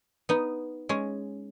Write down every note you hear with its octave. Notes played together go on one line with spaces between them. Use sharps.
B3 D#4
G#3 C#4